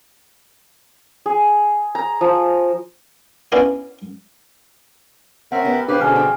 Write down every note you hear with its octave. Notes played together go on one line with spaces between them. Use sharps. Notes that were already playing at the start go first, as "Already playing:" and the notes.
G#4
A#5
F3
B3 C#4 D4 E4 D5 F5
C4 C#4 A#4 E5 F#5
B3 G4 B4
D4 G4 G#4 B4 C5 F5
B2 D3 F3 C#4 D#4 G#4 G#5 F6
C4 D4 G5